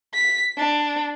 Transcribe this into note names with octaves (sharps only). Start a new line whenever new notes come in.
B6
D4